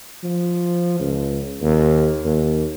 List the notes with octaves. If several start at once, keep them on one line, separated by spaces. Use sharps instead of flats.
F3
C#2
D#2
D#2